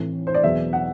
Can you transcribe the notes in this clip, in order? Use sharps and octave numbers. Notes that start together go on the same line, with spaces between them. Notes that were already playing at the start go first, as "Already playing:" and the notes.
Already playing: A2 E3 A3 C4
C5
D5
E2 B2 F#3 B3 E5
F#5